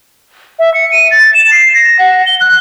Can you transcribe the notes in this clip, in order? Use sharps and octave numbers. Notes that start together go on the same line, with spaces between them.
E5
C#7
D#7
A6
E7
C7
A#6
F#5
G7
F#6